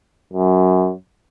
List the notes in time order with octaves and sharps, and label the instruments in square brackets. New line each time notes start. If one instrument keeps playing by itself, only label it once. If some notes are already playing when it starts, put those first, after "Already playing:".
[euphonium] F#2